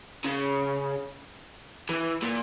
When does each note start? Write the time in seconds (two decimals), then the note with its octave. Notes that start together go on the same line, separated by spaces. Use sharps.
0.24 C#3
1.89 E3
2.23 A#2